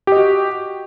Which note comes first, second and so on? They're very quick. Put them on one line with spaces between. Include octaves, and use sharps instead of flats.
G4 D#5 F#4